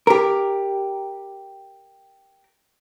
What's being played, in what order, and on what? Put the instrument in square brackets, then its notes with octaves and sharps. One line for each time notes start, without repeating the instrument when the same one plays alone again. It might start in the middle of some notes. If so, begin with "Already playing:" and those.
[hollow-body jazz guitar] G4 A#4